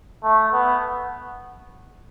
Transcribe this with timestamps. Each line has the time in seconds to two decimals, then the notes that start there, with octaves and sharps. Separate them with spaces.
0.24 A3
0.52 B3